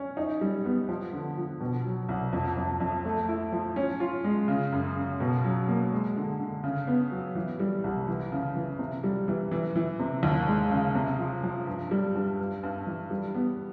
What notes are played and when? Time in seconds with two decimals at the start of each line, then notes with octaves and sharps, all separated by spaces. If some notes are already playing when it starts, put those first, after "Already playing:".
Already playing: C#4
0.17 D#4
0.41 G3
0.65 B3
0.89 F3
1.13 D3
1.37 F3
1.61 B2
1.85 F#3
2.09 C2
2.33 F2
2.57 F2
2.80 F2
3.05 A3
3.28 E4
3.52 F3
3.76 C#4
4.00 F4
4.24 G#3
4.48 C#3
4.72 F#2
4.96 C#3
5.20 B2
5.44 F#3
5.68 A#3
5.92 G#3
6.16 D3
6.40 D3
6.64 C#3
6.87 B3
7.11 F#3
7.35 E3
7.60 G3
7.84 C2
8.08 E3
8.32 C#3
8.55 E3
8.79 C3
9.04 G3
9.28 E3
9.51 E3
9.76 E3
10.00 C3
10.23 D#2
10.47 G#3
10.71 C#3
10.95 C3
11.19 F3
11.43 F3
11.67 G2
11.91 G3
12.15 G2
12.39 G2
12.63 G2
12.87 E3
13.10 G3
13.34 B3